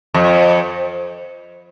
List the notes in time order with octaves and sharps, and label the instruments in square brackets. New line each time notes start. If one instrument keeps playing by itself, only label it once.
[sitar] F2